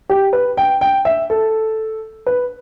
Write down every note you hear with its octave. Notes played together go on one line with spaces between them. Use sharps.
G4
B4
G5
G5
E5
A4
B4